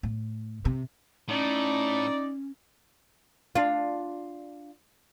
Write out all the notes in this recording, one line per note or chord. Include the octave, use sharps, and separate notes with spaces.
A2
C3
A2 C#4 D#4 D5
D4 F4